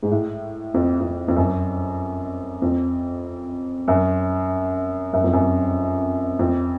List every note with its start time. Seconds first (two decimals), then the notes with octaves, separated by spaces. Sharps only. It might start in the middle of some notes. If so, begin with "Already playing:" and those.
0.03 G#2
0.11 A2
0.74 F2
1.00 F2
1.28 F2
1.36 F#2
2.62 F2
3.88 F#2
5.13 F#2
5.24 F2
5.33 F#2
6.39 F2